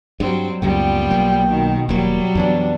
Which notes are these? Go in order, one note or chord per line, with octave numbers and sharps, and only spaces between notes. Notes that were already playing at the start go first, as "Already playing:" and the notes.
G2 F#3 G3 C4
C#2 F#2 A#2 G3 B3 F4 G5
B1 F#3 A#3
B2 D#3
D#1 F#3 G3 A#3
F2 E3 B3 D4